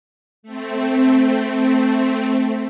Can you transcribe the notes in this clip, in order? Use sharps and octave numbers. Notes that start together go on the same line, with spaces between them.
A3 C4